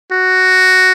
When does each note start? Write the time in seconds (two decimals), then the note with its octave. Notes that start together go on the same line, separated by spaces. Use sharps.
0.12 F#4